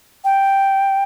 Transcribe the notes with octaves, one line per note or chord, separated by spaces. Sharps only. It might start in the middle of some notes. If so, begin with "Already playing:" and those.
G5